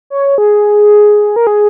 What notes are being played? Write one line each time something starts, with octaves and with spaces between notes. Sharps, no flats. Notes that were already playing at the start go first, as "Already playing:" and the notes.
C#5
G#4
A#4
G#4